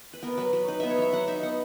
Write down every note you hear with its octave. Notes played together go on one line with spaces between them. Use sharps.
B4
B3 A#4
F#3 B4
F#3
D#4 B4
B3 E5
C#5
F#3 E5
F#3 F#5
D#4 E5
B3 F#5